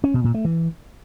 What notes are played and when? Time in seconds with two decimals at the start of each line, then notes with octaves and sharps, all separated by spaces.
0.04 C#4
0.14 B2
0.24 A#2
0.34 A3
0.45 E3